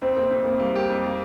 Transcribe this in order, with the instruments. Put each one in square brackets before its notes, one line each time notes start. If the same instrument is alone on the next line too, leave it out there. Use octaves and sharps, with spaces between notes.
[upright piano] F2 [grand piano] C4
[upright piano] C3 [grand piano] A#3
[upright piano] F2 [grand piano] C4
[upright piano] C3 [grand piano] A#3
[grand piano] G3 [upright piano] A#3
[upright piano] G4
F2
A#3